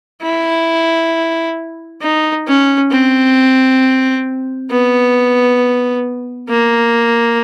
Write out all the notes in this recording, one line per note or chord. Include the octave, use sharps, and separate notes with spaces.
E4
D#4
C#4
C4
B3
A#3